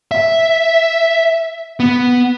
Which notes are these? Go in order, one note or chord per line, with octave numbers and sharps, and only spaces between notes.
E5
B3